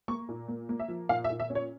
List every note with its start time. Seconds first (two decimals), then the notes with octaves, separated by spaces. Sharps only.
0.08 A#3 C#6
0.29 A#2
0.48 A#3
0.69 A#3
0.80 E5
0.88 F3
1.09 A#2 F5
1.24 E5
1.30 A#2
1.40 E5
1.50 C#4
1.55 C#5